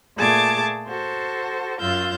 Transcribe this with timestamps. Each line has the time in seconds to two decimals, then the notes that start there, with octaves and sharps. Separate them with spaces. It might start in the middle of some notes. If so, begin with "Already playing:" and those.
0.16 A#2 A3 G#4 A5 D6 G#6
0.88 F#4 A4 C5
1.80 F#2 F4 F5 E6 G6 A#6